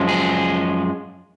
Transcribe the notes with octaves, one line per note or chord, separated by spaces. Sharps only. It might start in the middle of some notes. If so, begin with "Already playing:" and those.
Already playing: F#2 F3 G#3
G#4